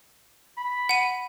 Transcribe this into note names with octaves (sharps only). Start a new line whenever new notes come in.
B5
F#5 D#7